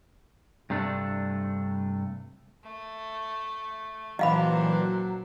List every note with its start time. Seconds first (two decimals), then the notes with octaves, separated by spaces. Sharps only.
0.70 G2 C3 A3 D4
2.63 A3
4.19 A#2 E3 F#3 C4 D4 D#5 F5 B5